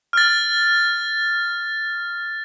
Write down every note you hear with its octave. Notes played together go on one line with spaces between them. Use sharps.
F6 A6